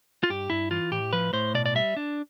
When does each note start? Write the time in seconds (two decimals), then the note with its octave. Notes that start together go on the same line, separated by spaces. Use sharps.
0.23 F4
0.30 G2 G4
0.50 G2 E4
0.71 E3 F4
0.91 A2 G4
1.13 F3 B4
1.33 A2 C5
1.54 B2 D5
1.66 D5
1.75 G3 E5
1.96 D4